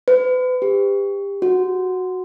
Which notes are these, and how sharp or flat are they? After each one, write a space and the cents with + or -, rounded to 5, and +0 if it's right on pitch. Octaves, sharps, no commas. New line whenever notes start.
B4 +40
G4 +25
F#4 -5